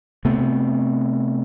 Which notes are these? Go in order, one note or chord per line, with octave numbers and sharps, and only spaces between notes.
C3 A3 B3 C4